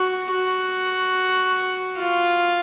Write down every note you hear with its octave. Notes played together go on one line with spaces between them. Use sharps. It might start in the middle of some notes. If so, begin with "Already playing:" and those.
Already playing: F#4
F#4
F4